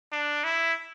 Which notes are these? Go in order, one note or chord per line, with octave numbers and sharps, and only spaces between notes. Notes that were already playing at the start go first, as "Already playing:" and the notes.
D4
E4